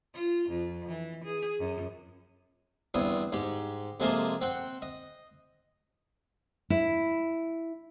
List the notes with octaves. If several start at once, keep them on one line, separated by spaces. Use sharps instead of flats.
F4
F2
E3
G#4
F#2
E2 G2 C4 D#6
G#2 G4
F2 C3 G#3 A#3 A5 D#6
C4 F#5 G5
D#5
E4